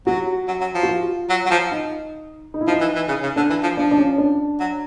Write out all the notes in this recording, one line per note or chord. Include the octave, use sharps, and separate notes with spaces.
F#3 F#4
F#3
F#3
F3
F#4
F4
F#3
F#3
F3
D#4
D#4
E4
F3 D#4
E3
E3
C#3
C#3
D3 D4
E3
F3
F3 D4
D4
C#4
D4
F#3